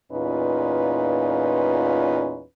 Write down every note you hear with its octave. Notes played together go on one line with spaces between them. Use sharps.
E2 A#2 C#4 D#4 F4 B4